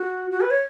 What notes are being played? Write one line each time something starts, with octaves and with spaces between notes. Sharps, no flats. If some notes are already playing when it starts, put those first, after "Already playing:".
Already playing: F#4
F#4
B4
C#5